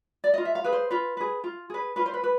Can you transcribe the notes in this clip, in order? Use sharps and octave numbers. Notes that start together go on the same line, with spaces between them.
D5
F4 D#5
E5
F5
G#4 B4
C5
F4 B4
G#4 B4
F4
G#4 B4
F4 B4
C5
B4
B4